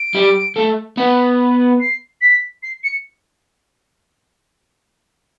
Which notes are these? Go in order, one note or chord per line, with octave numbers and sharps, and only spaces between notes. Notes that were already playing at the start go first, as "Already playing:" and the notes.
Already playing: D7
G3
A3
B3
C7
B6
C7
C#7